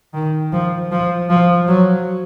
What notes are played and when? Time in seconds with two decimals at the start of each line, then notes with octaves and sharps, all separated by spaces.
0.14 D#3
0.53 F3
0.92 F3
1.30 F3
1.68 F#3